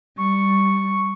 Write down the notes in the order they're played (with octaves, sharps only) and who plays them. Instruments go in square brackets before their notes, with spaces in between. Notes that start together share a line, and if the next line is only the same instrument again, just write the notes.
[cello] G3 [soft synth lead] C#6